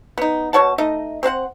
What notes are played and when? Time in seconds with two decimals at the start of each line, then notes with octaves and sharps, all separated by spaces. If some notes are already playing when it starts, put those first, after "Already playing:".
0.18 B3 D#4
0.53 B2 C#5 F#5 A5
0.78 A3 D#4 D#5
1.23 C4 C5 F5 F#5